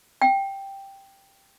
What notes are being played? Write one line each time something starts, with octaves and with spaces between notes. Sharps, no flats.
G5